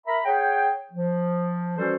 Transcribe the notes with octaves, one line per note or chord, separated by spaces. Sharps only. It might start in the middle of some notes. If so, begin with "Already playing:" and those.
A#4 E5 A#5 B5
G#4 C#5 F#5 G5
F3
E3 G3 C#4 F#4 A4 C5